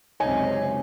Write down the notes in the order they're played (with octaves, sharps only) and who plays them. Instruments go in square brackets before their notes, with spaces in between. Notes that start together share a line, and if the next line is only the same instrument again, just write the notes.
[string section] C#2 F#2 C3 [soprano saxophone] D#4 [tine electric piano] C#5 [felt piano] G#5